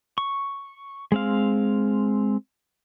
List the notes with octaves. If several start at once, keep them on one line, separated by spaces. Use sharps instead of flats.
C#6
G#3 C4 F5